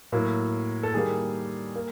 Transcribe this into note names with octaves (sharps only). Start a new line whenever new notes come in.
A2 F#3 A#3
A4
D#3 G3 A#3 G#4
A#3